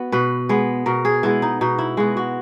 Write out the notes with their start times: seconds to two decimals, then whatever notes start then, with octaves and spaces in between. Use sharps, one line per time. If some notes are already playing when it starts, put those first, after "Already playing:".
Already playing: B3 F#4
0.12 B2 B4
0.49 G#3 B3
0.86 B2 A#4
1.05 G#4
1.23 G#3 B3 E4
1.42 D#4
1.61 B2 D#4
1.78 E4
1.97 G#3 B3 F#4
2.17 F#4